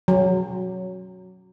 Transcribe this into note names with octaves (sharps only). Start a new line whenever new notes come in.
F#3